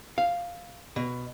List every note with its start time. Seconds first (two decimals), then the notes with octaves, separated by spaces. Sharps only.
0.18 F5
0.96 B2